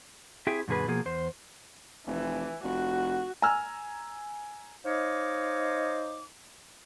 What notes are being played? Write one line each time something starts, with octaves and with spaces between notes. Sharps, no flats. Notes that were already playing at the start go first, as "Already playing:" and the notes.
C4 E4 G4 G#4 E5 G5
F#2 A#2 D3 G#4 B4
B2 F3 A#3 G#4
E2 C5
F1 E3
F1 F#4
G#5 A#5 E6 F6
D#4 C5 C#5 D#5 F5 D6